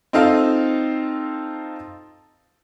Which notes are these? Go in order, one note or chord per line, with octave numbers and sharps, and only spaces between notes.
C4 D#4 F4 A4 F5